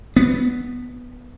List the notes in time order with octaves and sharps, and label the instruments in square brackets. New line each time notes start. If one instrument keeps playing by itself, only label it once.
[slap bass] B3